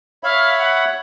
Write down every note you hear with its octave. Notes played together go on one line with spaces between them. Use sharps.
C#5 E5 F5 B5
F#5